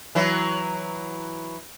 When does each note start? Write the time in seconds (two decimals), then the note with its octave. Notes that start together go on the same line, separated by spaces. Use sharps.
0.15 E3 F#3